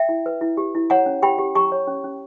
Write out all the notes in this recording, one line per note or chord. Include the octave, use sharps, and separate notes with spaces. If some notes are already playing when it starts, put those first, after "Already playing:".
Already playing: E5 G5
E4
B4
E4
G4
E4
C#5 F#5 A#5
C#4
G4 G5 B5
G4
G4 A#5 C#6
C#5
C#4
C#4